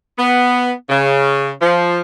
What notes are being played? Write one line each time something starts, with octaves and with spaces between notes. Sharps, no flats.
B3
C#3
F3